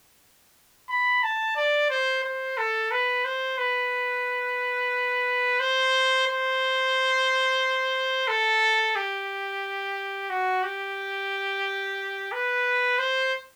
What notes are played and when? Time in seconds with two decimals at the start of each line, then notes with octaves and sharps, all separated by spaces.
0.89 B5
1.23 A5
1.56 D5
1.90 C5
2.24 C5
2.57 A4
2.91 B4
3.25 C5
3.58 B4
5.60 C5
6.27 C5
8.28 A4
8.96 G4
10.30 F#4
10.64 G4
12.32 B4
12.99 C5